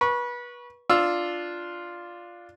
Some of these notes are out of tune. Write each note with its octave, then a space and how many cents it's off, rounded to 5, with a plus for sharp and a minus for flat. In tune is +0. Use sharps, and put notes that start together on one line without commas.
B4 -30 C#6 +0
D4 +0 F4 +0 E6 +0